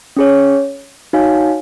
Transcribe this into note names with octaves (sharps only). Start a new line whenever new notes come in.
C#4 G#4 C#5
D#4 F#4 C#5 F5 G#5